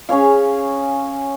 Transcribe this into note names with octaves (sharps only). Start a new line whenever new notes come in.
C#4 G#4 C#5 F5